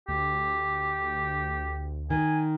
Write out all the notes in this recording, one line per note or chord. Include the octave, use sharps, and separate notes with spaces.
D2 G4
D#3 G#5